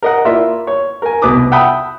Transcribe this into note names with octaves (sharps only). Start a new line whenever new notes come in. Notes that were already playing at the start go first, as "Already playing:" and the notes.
A#4 D#5 F#5
A#3 E4 F4 D5 E5
C#5
A#4 G#5
C2 B2 B4 D6 D#6
E5 F#5 G5 A5 B5 D#6